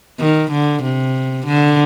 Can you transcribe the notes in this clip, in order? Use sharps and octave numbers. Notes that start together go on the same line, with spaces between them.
D#3
D3
C3
D3